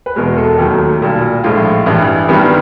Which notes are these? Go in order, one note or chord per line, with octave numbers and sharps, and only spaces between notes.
B4
E2 B2 G#3 A#4
A4
D#2 D#3 F#3 A3 G4
B1 A#2 G3
A#1 A2 F3 G#3 F4
A1 G2 E3 G3
G1 G2 D#3 G3 B3